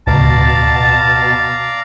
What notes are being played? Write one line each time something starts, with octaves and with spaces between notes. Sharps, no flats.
D1 C#2 B2 D5 F5 A5 A#5